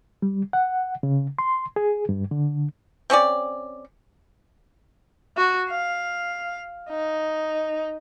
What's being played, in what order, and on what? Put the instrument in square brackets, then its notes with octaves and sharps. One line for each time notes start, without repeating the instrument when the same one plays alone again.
[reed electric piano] G3
F#5
C#3
C6
G#4
G2
D3
[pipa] C4 C#4 G#4 D5
[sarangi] F#4
F5
D#4